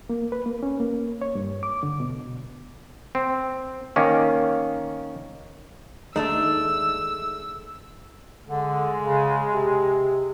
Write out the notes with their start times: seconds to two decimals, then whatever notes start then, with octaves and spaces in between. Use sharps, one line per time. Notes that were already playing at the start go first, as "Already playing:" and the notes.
0.09 A#3
0.32 B4
0.46 A#3
0.63 C#4
0.80 A#3
1.22 C#5
1.35 G2
1.63 D6
1.83 D3
2.00 B2
3.15 C4
3.96 D#3 A#3 C#4
6.16 D#2 G#3 A3 D4 D#4 E6
8.47 D3 G#3
8.99 C#3
9.52 C3